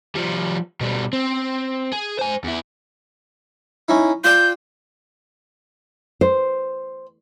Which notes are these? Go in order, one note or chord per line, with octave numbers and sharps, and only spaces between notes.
F3 G3
B2 G3
C4
G#4
C5 G#5
E2 E4
C#4 D#4 E4
F4 D5 G5 G6
C5